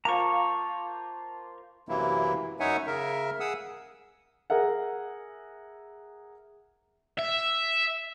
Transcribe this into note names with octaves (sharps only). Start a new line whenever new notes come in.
A#3 F4 C5 A5 A#5 C#6
F#2 C3 E3 F#3 A#3 E4
F#2 D#4 C#5 E5 F#5 G#5
C#3 A#4 E5
G#4 F#5 D#6 E6
G#4 A#4 E5 F#5
E5